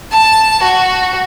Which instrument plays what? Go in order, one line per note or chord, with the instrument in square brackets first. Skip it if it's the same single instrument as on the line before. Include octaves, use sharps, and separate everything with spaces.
[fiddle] A5
F#4